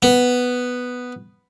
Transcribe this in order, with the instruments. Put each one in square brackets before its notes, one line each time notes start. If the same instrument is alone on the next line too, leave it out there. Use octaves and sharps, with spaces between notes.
[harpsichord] B3